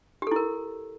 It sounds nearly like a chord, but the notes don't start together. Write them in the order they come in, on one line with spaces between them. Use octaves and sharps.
G4 A4 E4 A#4